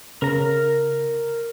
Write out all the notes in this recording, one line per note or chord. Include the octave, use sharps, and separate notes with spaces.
C#3 A#4 A#5